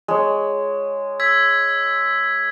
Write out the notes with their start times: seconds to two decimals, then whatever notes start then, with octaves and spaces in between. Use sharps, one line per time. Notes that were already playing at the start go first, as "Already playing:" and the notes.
0.08 G#3 C#5
1.20 E6 G#6 B6